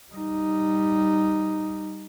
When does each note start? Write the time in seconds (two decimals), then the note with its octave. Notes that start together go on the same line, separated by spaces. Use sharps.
0.12 G3 D#4